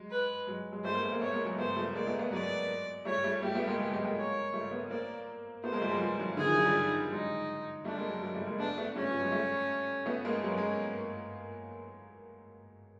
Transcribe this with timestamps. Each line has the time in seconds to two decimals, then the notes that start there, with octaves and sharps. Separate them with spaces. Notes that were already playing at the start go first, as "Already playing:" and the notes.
Already playing: F#3 G#3
0.10 B4
0.47 F#3 G#3
0.72 F#3 G#3
0.84 G3 A3 C5
0.94 G#3 A#3
1.03 A3 B3
1.12 A#3 C4
1.21 A3 B3 C#5
1.33 G#3 A#3
1.45 F#3 G#3
1.58 A3 B3 C5
1.76 G3 A3
1.95 G#3 A#3 D5
2.07 A3 B3
2.19 A3 B3
2.32 F#3 G#3 D5
3.05 G3 A3 C#5
3.24 G3 A3
3.42 G3 A3 G4
3.55 A3 B3
3.67 G#3 A#3
3.79 G#3 A#3
3.91 F#3 G#3
4.04 G#3 A#3
4.17 C#5
4.53 G3 A3
4.71 A3 B3
4.90 A#3 C4 D5
5.64 A3 B3 C5
5.72 G#3 A#3
5.82 G3 A3
5.91 F#3 G#3
6.00 F3 G3
6.19 E3 F#3
6.37 D3 E3 G#4
6.46 D#3 F3
6.56 E3 F#3
6.65 F3 G3
7.12 F#3 G#3 D#4
7.85 G3 A3 D4
7.97 G#3 A#3
8.09 F#3 G#3
8.22 F#3 G#3
8.35 G3 A3
8.46 G#3 A#3
8.59 A3 B3 D4
8.77 A3 B3
8.96 G3 A3 C#4
9.08 F3 G3
9.20 F#3 G#3
9.32 G3 A3
10.06 A3 B3
10.25 G#3 A#3
10.43 F#3 G#3 C#4
10.58 G#3